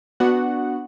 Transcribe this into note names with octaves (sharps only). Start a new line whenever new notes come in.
B3 D4 F#4 F#5